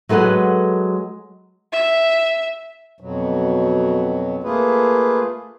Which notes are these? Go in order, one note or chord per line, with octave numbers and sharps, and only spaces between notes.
F#3 G#3 A4 B4 F#5
E5
F2 B2 F#3
A3 A#3 F4 G#4 B4